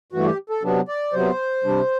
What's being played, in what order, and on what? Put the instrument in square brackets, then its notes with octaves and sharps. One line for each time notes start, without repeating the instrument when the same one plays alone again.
[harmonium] G2 E3 A3 F#4
G4
A4
C3 F#3 B3 D4
D5
C3 F#3 B3 C5
C3 G3 D4